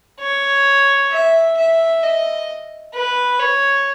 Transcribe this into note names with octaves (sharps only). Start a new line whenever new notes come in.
C#5
E5
E5
D#5
B4
C#5